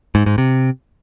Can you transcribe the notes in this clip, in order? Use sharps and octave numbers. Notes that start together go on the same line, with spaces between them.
G#2
G#2
C3